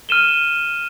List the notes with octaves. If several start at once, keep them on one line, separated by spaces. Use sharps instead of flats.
F6 D#7 E7 G7